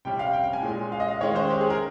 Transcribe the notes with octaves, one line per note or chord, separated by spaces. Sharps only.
C3 G3 C#4 G5
F5
G5
G5
G#5
A#2 G#3 C#4
F5
D#5
F5
D#3 G#3 C#4 C#5
C5
G4
G#4
A#4